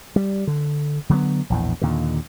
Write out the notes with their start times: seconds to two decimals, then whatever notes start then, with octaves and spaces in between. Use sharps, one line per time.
0.16 G3
0.47 D3
1.09 D3 F#3 G#3 B3
1.50 A#1 E2 A2
1.82 D#2 A#2 D3